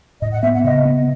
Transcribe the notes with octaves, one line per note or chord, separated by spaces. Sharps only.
A2 D#5
F#5
B3 E5
F#5
C#3 D#5
B3